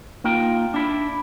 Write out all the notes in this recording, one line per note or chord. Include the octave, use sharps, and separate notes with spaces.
A#3 D#4 F4 G5
D4 E4